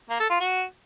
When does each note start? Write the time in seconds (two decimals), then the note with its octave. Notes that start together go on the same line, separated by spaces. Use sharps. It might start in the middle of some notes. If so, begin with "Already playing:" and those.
0.10 A#3
0.20 A4
0.30 F4
0.40 F#4